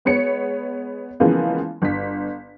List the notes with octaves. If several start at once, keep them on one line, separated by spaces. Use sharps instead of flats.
G#3 B3 C#5 C#7
C#3 E3 F3 G#3 A#3 B3
G1 B6